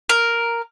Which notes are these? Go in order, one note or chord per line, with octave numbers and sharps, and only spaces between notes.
A#4